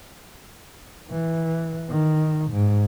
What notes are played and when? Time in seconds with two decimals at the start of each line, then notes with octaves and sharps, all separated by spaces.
1.11 E3
1.90 D#3
2.51 G#2